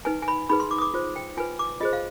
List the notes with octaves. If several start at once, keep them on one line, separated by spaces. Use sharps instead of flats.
D#4 B4 G#5
G#5
B5
D#4 G#4 B4 B5
C6
D6
D#6
D6
F4 C5
G5
F4 B4 G#5
D6
F4 G#4 C5 D#5
F5